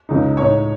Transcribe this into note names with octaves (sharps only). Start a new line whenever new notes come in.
C#2 C#3 G#3 D#4
A2 G#3 D#4 C#5